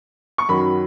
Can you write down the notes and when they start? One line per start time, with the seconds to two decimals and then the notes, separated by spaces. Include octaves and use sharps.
0.38 C#6
0.49 F#2 D#3 F#3 B5